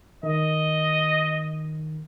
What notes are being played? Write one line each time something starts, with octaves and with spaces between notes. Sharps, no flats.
D#3 D#5